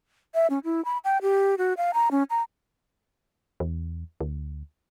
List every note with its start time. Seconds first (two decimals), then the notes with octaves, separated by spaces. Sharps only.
0.35 E5
0.50 C#4
0.64 E4
0.85 B5
1.04 G5
1.22 G4
1.58 F#4
1.77 F5
1.94 A#5
2.11 C#4
2.30 A#5
3.60 E2
4.21 D2